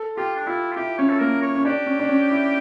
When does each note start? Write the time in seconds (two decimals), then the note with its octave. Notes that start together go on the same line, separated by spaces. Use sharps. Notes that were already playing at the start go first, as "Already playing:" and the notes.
Already playing: A4
0.17 F4 G4
0.37 D4
0.47 E4 F4
0.72 F4
0.76 E4 G4
0.98 C#4 C#5
1.10 A4
1.20 A#3 A#4
1.43 C#5
1.55 C#4
1.65 D4 G4
1.87 C#4
2.00 D4
2.09 C#4
2.31 E4